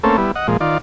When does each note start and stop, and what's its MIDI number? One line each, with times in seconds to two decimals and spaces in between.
0.03 0.17 57
0.03 0.17 58
0.03 0.17 60
0.03 0.17 61
0.03 0.17 69
0.18 0.31 55
0.18 0.31 59
0.18 0.31 64
0.35 0.47 75
0.35 0.47 78
0.48 0.57 46
0.48 0.57 53
0.48 0.57 56
0.61 0.78 51
0.61 0.78 65
0.61 0.78 74